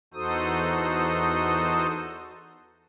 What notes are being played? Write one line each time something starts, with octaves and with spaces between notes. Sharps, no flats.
E2 D#4 F#4 A4 C5 D#6